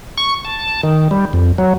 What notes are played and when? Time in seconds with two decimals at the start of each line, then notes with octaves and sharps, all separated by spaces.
0.18 C#6
0.45 A5
0.83 D#3
1.11 G3
1.33 F2
1.58 F#3